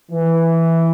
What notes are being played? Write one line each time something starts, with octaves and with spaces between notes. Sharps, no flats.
E3